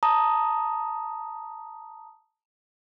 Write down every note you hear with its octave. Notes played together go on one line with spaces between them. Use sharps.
A5 A#5 D#6